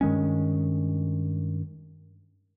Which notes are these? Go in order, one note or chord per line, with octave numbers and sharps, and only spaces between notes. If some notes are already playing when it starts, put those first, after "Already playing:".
G2 D#3 G#3 C#4